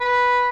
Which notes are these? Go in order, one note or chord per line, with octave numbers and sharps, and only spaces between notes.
B4